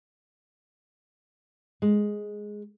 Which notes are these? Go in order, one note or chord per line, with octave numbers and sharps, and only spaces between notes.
G#3